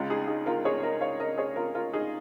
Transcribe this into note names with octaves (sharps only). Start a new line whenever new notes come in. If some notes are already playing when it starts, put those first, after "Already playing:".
Already playing: C#2 C#3 G#3 F4
D#4 G#4
D#4 G#4
F4 A#4
G#4 C#5
A#4 D#5
C#5 F5
A#4 D#5
G#4 C#5
F4 A#4
F4 A#4
D#4 G#4